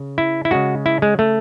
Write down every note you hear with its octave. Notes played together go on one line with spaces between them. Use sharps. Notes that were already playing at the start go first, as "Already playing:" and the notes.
Already playing: C#3
E4
E4
C#3 G#3 F#4
E4
G#3
A3